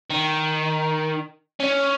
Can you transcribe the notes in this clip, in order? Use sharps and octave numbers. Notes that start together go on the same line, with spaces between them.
D#3
C#4